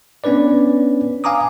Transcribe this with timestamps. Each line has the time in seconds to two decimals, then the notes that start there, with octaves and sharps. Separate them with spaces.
0.24 B3 C#4 D4 B4 D5
1.24 F5 G#5 A#5 D6 D#6